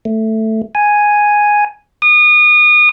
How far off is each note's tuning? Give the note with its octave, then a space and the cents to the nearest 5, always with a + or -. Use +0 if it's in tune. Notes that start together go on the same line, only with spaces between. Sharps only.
A3 +5
G#5 +0
D#6 -30